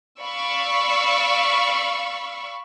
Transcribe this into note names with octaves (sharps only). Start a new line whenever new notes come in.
D5 F5 B5 C#6 E6